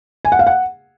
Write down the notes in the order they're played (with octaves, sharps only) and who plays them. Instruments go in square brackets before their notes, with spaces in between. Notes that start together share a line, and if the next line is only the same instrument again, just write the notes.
[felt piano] G#5
F#5
F5
F#5